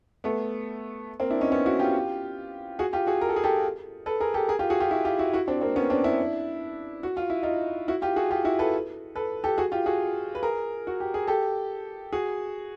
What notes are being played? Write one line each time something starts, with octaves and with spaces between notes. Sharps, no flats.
A3 B3
A#3 C4
D4 E4
C#4 D#4
B3 C#4
E4 F#4
F4 G4
F#4 G#4
F4 G4
F#4 G#4
A#4
A4
G#4
G4 A4
A4 B4
G#4 A#4
G4 A4
G#4 A#4
F4 G4
F#4 G#4
F4 G4
E4 F#4
F4 G4
E4 F#4
E4 F#4
C4 D4
A#3 C4
B3 C#4
C4 D4
D4 E4
F#4
F4
E4
D#4 F4
E4 F#4
F4 G4
F#4 G#4
F4 G4
E4 F#4
A4 B4
A4 B4
G4 A4
F#4 G#4
F4 G4
F#4 G#4
B4
G#4 A#4
F#4
G4
G#4
G4 A4
F#4 G#4